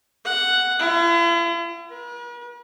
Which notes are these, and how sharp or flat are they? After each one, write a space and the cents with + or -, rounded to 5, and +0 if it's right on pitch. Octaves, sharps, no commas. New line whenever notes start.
F#5 +0
E4 +45
B4 -45